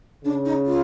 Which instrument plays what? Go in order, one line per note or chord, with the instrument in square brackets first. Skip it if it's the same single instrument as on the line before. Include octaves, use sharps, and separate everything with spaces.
[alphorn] C#3 [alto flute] D4
[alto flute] D#4
F4